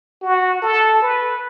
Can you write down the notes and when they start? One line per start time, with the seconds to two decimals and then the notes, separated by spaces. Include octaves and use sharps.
0.22 F#4
0.62 A4
1.02 B4